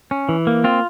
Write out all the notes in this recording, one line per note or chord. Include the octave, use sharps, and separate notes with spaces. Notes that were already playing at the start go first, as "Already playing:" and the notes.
C#4
E3
A#3
C4 F4